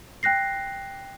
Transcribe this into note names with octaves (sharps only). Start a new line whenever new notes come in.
G5 F#6 A#6 C7